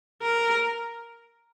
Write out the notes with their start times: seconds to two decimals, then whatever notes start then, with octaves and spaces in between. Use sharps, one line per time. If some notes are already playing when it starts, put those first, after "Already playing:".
0.22 A#4